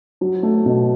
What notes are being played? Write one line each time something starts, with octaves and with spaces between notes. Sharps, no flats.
F#3
A3
B2